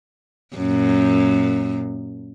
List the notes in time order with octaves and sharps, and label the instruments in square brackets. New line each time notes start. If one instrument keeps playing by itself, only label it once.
[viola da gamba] F#2 A#2